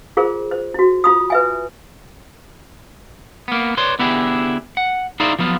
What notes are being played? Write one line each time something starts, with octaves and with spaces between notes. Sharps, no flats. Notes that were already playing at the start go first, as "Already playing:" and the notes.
F4 G#4 A#4 C5
C5
E4 F#4
F4 B5 D#6
B4 E5 G#5
A#3 B3
B4 C#5 D5 C6
D3 B3 E4 G4 G#4
F#5
D#4 E4 G#4 C5 D5 F5
F3 F#3 B3 F4